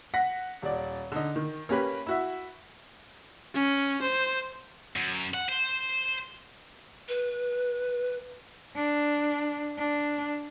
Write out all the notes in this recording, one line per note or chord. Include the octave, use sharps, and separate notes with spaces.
F#5 A#6 B6
D#1 D5
D3 D#4
D#3
A#3 C#4 G4 B4
E4 F#4 E5
C#4
C5
F#2
F#5
C5
B4
D4
D4